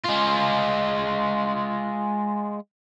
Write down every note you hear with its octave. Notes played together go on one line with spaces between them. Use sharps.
G#3 F4